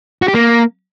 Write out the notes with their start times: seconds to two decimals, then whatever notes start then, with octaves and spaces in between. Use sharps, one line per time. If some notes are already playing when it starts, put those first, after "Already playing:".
0.22 F#4
0.28 G4
0.34 A#3